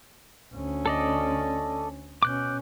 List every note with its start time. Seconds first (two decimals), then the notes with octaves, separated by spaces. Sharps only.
0.54 D2 C#4
0.86 A4 D5 D#5
2.23 B2 C#4 D6 F#6 G6